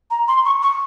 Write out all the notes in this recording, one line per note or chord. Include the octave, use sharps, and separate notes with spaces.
A#5
C6
C#6
C#6